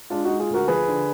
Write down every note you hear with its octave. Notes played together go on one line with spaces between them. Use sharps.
G#3 D4 F4
D#4 F#4
G#3
F4 G#4
D2 F#4 A#4
F3 G#4 B4
D3